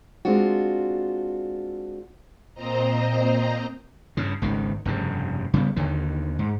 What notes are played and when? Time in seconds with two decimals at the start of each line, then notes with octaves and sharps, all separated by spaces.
0.25 G#3 C4 D4 F4 F#4
2.54 A#2 C4 C5 D#5 A#5
4.17 G2 C#3
4.42 G#1 C#2 D#3
4.85 F1 G2 C#3
5.53 C#3 G3 G#3 B3
5.76 D#2 D3 D#3
6.39 G#2